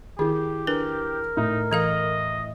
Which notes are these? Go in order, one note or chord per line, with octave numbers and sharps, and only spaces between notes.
D#3 E4 G4 G#4
D4 A#4 B4
A2 D#4
E3 A4 D#5 F5